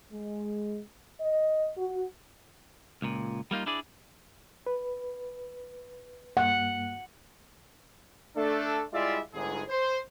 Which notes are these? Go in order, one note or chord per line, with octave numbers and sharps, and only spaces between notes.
G#3
D#5
F#4
C#2 A#2
G3 A#3 D#4 F4
D4 E4 G#4 D5
B4
G2 A#3 F#5
A3 D4 A4
G3 G#3 E4 F4 D5 E5
G1 G#2 G#4
C5